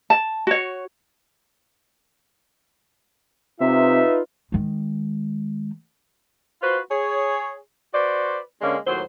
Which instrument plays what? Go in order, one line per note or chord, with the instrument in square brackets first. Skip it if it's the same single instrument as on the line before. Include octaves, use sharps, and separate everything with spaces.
[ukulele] A5
F#4 C#5
[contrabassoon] C3 [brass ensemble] D#4 F4 B4 [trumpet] E5
[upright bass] D#3 G#3
[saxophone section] F4 F#4 B4 C5
G#4 C#5
F#4 B4 C5 D5
D3 G#3 A#3 C#4 D4
D#2 A2 F#3 C5